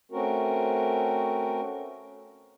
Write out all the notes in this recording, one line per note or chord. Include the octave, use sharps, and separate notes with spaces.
A3 C4 C#4 F#4 A#4